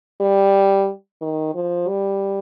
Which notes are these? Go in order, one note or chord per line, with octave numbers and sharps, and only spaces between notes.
G3
D#3
F3
G3